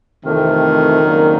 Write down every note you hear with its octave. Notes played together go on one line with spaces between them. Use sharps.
F2 C3 D#3 E3 A3
F2 C#3 F#3 A#3 D4